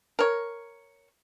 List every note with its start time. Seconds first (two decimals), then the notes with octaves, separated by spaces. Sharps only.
0.19 A#4 C#5